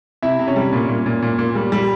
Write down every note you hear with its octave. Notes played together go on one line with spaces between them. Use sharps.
C3 E4 E5
C3
C#4 C#5
G3
A#2
A#2
A#2
A#2
A#2
G3
G3